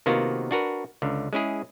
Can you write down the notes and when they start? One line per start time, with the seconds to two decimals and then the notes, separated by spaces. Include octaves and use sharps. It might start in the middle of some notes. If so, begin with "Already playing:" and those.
0.06 C3 D#3 A#3 B3 F4 F#4
0.51 D4 F#4 A#4 B4
1.02 C#2 D3
1.33 G#3 C#4 E4 G#4